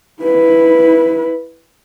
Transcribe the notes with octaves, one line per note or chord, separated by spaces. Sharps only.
E4 B4